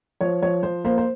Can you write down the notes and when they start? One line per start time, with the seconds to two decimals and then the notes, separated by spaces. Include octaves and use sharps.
0.21 F3 C#5
0.42 F3 C#5
0.63 F3 C5
0.85 A#3 C5
0.98 C5